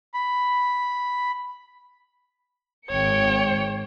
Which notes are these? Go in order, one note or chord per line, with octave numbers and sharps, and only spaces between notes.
B5
G#1 C#5 G5 C#7